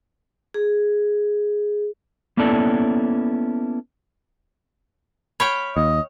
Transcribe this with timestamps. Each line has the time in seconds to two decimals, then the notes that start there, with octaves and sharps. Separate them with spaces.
0.54 G#4
2.37 A#3 B3 C#4 E4 A4 D5
5.40 C#5 F5 G5 B5
5.77 D#2 D#5